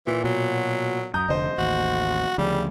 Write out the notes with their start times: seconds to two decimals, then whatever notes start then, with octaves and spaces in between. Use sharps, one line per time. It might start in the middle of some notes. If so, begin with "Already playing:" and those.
0.07 A#2 E3
0.24 B2 F#3
1.14 F#2 A#5 D#6 G6
1.28 F1 D3 C5 D#5
1.58 A1 D#2 F#4
2.38 D2 C#3 F3 G3